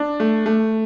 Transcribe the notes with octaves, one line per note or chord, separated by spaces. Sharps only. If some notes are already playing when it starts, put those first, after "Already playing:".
Already playing: D4
A3
A3